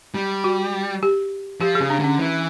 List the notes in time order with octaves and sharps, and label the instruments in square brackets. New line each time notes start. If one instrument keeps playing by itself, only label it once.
[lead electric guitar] G3
[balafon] F#4
G4
[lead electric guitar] F3 [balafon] G4
[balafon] G#4
[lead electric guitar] C#3
[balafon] D4
[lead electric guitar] D3 [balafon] C#4
[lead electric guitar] E3